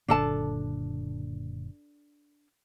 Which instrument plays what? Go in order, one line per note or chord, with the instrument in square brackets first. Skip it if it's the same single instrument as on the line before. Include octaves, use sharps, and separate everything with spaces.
[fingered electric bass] F#1 A#2 D3 [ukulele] D4 A4 A5